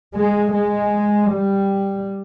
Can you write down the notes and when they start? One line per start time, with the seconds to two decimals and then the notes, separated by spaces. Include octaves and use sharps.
0.14 G#3
0.53 G#3
1.31 G3